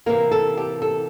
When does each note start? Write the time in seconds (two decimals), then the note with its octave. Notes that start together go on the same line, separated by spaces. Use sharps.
0.06 C3 E3 A#3 A#4
0.31 A4
0.57 G4
0.82 A4